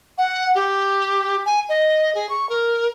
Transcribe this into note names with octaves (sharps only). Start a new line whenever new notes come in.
F#5
G4
G#5
D#5
G#4
C#6
A#4